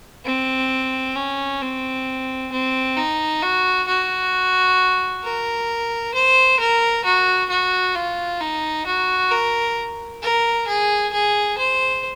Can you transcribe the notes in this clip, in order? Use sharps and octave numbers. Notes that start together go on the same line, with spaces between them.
C4
C#4
C4
C4
D#4
F#4
F#4
A#4
C5
A#4
F#4
F#4
F4
D#4
F#4
A#4
A#4
G#4
G#4
C5